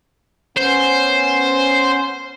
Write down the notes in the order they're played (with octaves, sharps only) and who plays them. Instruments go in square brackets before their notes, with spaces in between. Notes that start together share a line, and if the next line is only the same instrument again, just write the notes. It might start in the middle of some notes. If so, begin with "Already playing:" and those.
[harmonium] B3 C#4 [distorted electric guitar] C5